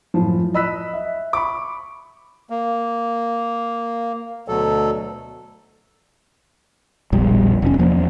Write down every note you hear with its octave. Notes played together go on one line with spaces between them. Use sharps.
F#2 A2 F3
D#5 B5 E6 F#6 B6
E5
B5 C#6 D6
A#3
D2 B2 F#3 A4
E1 A#1 B2 G3
F1 C#4
E2 F3 A#3